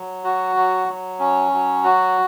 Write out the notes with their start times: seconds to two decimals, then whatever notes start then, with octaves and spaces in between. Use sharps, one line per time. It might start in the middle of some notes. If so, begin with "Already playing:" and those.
Already playing: F#3
0.24 F#4
0.56 F#3
0.88 F#3
1.19 C#4
1.52 F#3
1.84 F#4